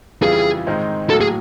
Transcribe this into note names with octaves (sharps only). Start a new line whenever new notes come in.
F2 C#3 E3 G3 G#4
G#2 D#3 G#3 C4 D#4
A2 F#3 A#3 A4
G#4